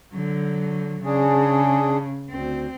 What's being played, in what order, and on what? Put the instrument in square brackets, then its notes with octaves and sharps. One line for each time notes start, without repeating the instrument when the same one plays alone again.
[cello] D3 F#3
[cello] C#3 [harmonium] D4 G#4
[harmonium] D2 [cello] C4